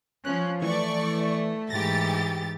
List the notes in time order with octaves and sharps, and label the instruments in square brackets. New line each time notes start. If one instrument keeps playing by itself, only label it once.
[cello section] F3 C#4 [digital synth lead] F#6
[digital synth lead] E3 [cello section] A3 [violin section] D5 C#6
[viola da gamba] G#2 E3 [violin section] G4 A6 [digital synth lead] A#6